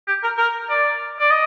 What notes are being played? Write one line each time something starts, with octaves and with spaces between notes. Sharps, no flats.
G4
A#4
A#4
D5
D5
D#5